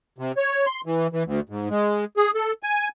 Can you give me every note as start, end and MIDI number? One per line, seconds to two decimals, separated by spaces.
0.18 0.32 48
0.37 0.66 73
0.66 0.81 84
0.86 1.07 52
1.13 1.23 52
1.25 1.40 38
1.49 1.69 44
1.70 2.05 56
2.17 2.31 68
2.35 2.52 69
2.63 2.88 80